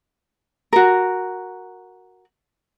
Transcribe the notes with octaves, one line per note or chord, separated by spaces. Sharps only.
F#4 A#4